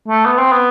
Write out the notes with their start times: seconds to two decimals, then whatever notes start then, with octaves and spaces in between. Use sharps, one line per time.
0.08 A3
0.26 B3
0.38 C4
0.52 B3